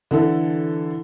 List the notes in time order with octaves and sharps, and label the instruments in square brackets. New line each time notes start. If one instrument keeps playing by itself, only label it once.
[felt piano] D3 E3 A4